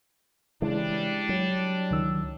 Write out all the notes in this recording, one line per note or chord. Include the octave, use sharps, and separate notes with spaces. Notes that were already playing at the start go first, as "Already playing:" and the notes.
C#3 E3 G3 G#3 D4 E4
F#3
C#2 D#3 E6